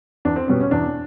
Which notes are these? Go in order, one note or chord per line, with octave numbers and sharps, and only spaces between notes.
E2 D4
C4
B2 G3 B3 C#4
C#4
E2 D4